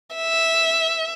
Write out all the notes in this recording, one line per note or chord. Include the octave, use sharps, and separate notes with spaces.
E5